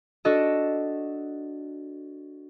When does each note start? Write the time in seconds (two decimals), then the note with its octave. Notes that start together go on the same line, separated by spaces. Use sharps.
0.25 D4 F#4 A4 D#5